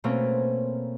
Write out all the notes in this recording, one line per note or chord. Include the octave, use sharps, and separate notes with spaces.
B2 A3 A#3 C4 C#4